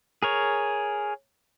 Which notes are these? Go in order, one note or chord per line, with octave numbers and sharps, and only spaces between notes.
G#4 A#4 C#5